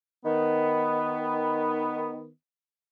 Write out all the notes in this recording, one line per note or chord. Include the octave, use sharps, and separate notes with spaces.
D#3 B3